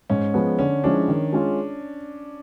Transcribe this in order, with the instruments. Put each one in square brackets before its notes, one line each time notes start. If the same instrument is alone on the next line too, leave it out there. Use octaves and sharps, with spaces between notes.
[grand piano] G#2 [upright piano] C#4
[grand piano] F3 G#3 B3
[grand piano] D3 [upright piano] C#4
[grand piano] F3 G#3 C#4 E4 [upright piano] D4
[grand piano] D#3
G#3 C#4 F4